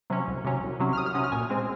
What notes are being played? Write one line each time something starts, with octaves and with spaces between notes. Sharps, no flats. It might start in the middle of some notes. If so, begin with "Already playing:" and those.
C3 F#3 C#4
C2
C3 F#3 C#4
C2
C3 F#3 C#4
F6
C2 D#6
F6
C3 F#3 C#4 D#6
F6
A#2 G#5
G#3 C4